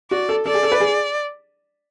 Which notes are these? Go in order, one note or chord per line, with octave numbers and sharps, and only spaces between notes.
F#4 D5
A4
A4 D5
G#4
A4
B4
G#4